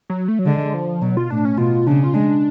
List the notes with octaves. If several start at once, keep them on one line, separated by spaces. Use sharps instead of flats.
F#3
A3
F#3
D3 G#3
F3
B2 F#3
F4
A2 D4
C#4
B2 F4
C#3 D4
F4
G#3 D4